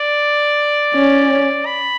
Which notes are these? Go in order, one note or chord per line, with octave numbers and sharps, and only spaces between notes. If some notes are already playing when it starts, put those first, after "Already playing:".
Already playing: D5
C#4
B5